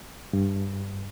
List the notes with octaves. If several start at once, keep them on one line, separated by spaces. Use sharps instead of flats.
G2